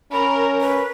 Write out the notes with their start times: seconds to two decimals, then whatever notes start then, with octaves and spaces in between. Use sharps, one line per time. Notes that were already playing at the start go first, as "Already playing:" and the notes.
0.12 C#4 A#4 B5
0.61 B4